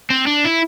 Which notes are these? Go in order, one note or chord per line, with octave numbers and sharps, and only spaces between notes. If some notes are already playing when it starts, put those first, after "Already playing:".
C4
D4
E4